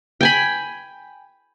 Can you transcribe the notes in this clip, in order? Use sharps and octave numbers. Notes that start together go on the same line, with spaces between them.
G5 G#5 B5